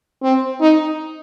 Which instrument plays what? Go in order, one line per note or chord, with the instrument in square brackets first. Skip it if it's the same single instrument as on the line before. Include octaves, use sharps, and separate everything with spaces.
[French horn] C4
D#4